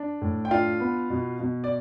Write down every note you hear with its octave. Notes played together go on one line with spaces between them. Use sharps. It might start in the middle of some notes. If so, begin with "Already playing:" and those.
Already playing: D4
A2
G5
D4 F4 F5
B3
B2
B2
D5